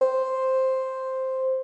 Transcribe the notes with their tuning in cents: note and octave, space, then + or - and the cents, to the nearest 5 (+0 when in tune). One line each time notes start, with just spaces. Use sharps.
C5 +0